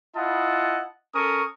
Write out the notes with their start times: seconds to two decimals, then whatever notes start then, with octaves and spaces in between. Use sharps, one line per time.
0.16 E4 F4 D#5 F#5 A5
1.15 C#4 A4 A#4 C#6 D#6